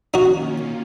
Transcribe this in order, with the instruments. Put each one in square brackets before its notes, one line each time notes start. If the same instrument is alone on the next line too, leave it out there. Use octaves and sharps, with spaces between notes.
[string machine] D#3 A#3 C#4 F4 [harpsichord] D#4 F#4